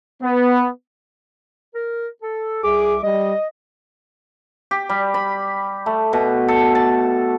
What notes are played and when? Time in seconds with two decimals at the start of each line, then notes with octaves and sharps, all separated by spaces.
0.22 B3
1.75 A#4
2.22 A4
2.64 C2 G#4 E5 D6
3.03 G3 D#5
4.71 G4
4.89 G3
5.14 B5
5.86 A3
6.13 B2
6.48 A4
6.75 A5